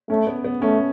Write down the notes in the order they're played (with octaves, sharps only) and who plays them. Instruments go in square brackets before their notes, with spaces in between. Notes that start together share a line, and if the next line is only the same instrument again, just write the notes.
[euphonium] A3 [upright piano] C#4
[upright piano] B3
B3
[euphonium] A3 [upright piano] C#4